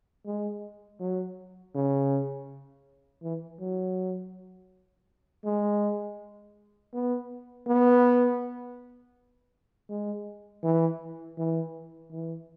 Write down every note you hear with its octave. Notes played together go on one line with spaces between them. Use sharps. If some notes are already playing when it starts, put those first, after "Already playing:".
G#3
F#3
C#3
E3
F#3
G#3
B3
B3
G#3
E3
E3
E3